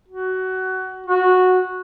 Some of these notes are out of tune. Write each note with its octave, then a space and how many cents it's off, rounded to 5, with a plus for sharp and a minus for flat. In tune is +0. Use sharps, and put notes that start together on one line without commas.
F#4 +20
F#4 -10